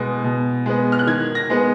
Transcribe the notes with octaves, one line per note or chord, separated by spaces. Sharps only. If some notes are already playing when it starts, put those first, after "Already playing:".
Already playing: B2 G#3 B3
B2
G#3 B3
F6
F#6
D#3 G#6
A#6
G#3 B3